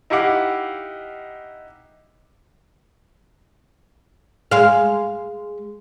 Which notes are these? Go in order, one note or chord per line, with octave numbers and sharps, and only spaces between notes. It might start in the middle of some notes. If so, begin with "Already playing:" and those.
D#4 E4 G4 F5 F#5 D6
G#3 F5